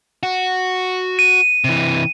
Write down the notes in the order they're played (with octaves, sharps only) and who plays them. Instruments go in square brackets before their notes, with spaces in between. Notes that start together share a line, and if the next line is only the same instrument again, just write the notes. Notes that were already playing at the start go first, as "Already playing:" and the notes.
[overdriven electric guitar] F#4
[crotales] D#7
[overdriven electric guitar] C3 E3